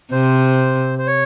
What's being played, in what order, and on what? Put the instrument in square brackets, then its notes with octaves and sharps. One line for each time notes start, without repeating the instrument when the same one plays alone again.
[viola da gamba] C3 [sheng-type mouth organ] C5
[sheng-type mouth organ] C5
C#5